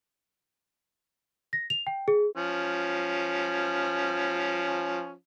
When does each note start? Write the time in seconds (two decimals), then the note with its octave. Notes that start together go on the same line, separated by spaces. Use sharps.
1.53 A#6
1.70 F7
1.87 G5
2.08 G#4
2.35 F3 C#4